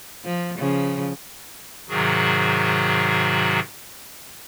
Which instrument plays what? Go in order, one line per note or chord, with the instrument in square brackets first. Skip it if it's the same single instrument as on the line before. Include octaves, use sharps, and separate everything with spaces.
[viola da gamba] F3
C#3 F3
[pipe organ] G#2 C3 D#3 F#3 F#4 G#4